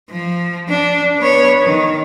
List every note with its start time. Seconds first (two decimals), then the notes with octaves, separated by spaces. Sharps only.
0.10 F3
0.69 D4
1.19 B3 C#5
1.62 D#3